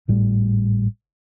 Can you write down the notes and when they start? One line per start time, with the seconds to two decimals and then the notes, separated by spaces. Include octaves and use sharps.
0.08 G#1 A2 G3